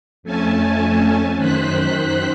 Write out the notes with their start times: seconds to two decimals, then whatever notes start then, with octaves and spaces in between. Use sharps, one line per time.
0.23 F2 A3 C#4 G#5 A5
1.37 F#2 D#3 C5 F#6 B6